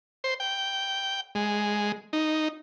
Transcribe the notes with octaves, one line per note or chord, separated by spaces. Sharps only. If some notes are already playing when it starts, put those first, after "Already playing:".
C5
G5
G#3
D#4